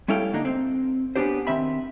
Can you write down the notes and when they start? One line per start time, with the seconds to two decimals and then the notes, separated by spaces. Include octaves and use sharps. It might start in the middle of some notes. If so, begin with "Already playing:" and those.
0.08 G3 C#4 E4 A4 F5 G5
0.33 D3 A#3 D4 D#4
0.45 C4
1.16 B3 C#4 D4 G4 C5
1.47 D#3 C4 E5 B5